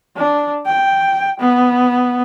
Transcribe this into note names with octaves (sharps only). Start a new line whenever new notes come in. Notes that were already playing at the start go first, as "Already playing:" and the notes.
D4
G5
B3